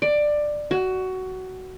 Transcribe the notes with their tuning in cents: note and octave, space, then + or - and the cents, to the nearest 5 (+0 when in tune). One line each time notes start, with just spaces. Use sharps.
D5 +15
F#4 +15